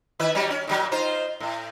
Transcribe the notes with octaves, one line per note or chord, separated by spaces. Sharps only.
D#3 E4 B4
F#3 G3 C#4
C#4
A#2 C#3 F#3
D#4 F4 C5
A2